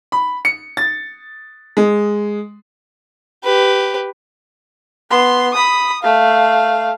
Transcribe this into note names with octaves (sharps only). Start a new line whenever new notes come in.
B5
C#7
A6
G#3
G4 B4
B3 C6
B5 D#6
A3 F5